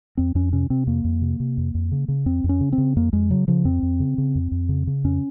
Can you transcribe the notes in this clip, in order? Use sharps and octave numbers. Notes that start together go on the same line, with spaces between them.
F2 C4
F2 C#4
C3 C#4
C3 C4
F2 A#3
F2
C3
C3
F2
F2
C#3
C#3
F2 C4
F2
C#4
C#3
C4
C#3
F2 A#3
F2 G#3
C#3 F#3
C#3 F3
F2 C4
F2
C#3
C#3
F2
F2
C#3
C#3
F2 C#4